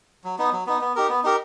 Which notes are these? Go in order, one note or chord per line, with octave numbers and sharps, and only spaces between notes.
F#3
B3 D#4
F#3
B3 D#4
B3
D#4 G4 A#4
B3
D#4 G4 A#4